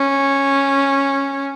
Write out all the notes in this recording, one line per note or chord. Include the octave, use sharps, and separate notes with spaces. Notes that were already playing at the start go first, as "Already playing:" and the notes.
Already playing: C#4